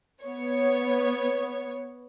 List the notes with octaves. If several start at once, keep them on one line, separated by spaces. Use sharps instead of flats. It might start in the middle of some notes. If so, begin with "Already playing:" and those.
B3 C#5